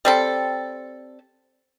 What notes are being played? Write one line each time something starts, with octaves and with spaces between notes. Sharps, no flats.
G3 C4 A4